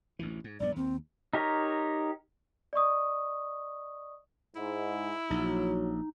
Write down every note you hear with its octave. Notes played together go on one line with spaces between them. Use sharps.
A1 D2 E3
G#2
A#1 G2 B3 D5
D#2 C4
D#4 G4 A#4 C#5
D5 D#5 C#6 D#6
G#2 E4
A#1 F#3 D#4